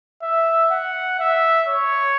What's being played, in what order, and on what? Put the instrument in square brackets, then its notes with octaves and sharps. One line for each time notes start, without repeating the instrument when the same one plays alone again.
[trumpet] E5
F#5
E5
C#5